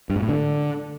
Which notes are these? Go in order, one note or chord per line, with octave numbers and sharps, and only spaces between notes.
G2
G#2
A2
D3